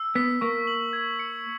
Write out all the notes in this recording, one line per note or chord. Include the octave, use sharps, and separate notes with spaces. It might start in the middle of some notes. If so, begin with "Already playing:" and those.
Already playing: E6
B3 B6
A#3 C#6
F#7
G#6
C#7